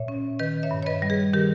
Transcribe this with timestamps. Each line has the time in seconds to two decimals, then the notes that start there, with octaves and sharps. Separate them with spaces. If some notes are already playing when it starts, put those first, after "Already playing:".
Already playing: A#2 C#5 E5
0.08 C#4
0.39 D#3 B4 D#5
0.63 C#5 E5
0.71 G2
0.83 C#5
0.86 B4 D#5
1.02 G3
1.10 G#4 B4
1.33 D#3 G4 A#4